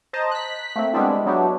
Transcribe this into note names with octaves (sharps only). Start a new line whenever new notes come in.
C5 D#5 A5 A#5
F#6 B6
A3 A#3 C4
G3 G#3 B3 C4 D4 E4
G#3 E4
F#3 B3 D4 E4 F#4 G4